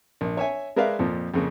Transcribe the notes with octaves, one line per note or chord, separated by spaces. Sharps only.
A#1
C#5 E5 G#5
G#3 A#4 B4 D5 E5 F5
F2 A#2 F3
F2 C#3 A#3